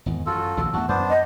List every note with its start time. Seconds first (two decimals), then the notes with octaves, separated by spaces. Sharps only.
0.06 G#1 E2
0.26 F#2 F4 F#4 A4
0.57 A#1 D#2 B2
0.74 E2 G2 A3 F#4 A5
0.89 F#2 B3 D4 C5
1.09 D#5